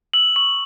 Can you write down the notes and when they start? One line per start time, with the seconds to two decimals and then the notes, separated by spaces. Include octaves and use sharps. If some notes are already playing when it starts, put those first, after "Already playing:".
0.14 E6 F#7
0.36 C#6 F#7